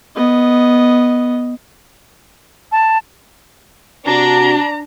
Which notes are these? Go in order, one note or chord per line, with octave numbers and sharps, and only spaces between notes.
B3 D#5
A5
C3 D4 F#4 A#5